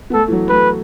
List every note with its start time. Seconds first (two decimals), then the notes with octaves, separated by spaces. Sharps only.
0.10 B3
0.14 A3 A4
0.28 E3
0.32 F#3
0.49 A3 B4